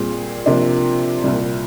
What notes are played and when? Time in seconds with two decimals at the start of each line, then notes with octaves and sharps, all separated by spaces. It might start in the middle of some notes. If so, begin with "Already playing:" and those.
Already playing: A#2 G3 C4 G#4
0.46 C3 F3 A#3 D4
1.24 C2 A#2 G3